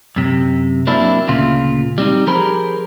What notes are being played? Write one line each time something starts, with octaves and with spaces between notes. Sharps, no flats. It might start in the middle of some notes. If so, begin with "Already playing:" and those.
F#2 C3
F#3 A#3 C4 D4 E4
D2 A#2 C#3 F4
G3 C4 D4 D#4
F3 G4 G#4 A#4 C5 B5